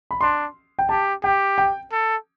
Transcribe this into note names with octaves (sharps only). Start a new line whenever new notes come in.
B5
D4 C6
G5
G4 A5
G4 G5
G5
A4